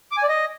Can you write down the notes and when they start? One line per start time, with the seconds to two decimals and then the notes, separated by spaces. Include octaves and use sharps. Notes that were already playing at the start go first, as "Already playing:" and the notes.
0.12 D6
0.17 G#5
0.23 D5
0.29 D#5